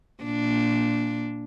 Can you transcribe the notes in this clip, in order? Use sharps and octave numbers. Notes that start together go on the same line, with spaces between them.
A#2 D4